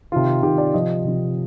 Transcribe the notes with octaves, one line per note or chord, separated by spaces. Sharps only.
C3 D#3 F4
C3 D#3 G4
D5
C3 F3 D#5
C3 F3